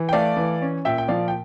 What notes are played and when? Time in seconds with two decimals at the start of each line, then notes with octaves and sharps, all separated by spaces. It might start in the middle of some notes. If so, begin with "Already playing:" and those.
Already playing: E3
0.09 G5
0.13 A3 D5 F5
0.37 E3
0.61 C#4
0.85 A#2 E5 G5
0.98 G5
1.08 F3 D5 F5
1.28 G5